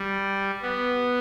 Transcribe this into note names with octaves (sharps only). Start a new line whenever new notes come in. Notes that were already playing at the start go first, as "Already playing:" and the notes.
Already playing: G3
B3